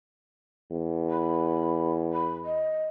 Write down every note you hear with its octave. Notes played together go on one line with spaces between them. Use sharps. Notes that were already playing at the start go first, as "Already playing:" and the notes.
E2
B5
B5
D#5